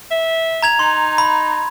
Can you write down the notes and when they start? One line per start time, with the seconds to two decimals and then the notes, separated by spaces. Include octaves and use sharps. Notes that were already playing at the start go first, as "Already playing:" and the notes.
0.11 E5
0.63 A#5 G#6 F7
0.79 D#4 C6
1.18 B5